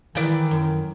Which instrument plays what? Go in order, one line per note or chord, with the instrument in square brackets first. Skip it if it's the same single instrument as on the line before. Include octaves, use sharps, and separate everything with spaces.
[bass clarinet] D#3 [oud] E3 D5
[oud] F#2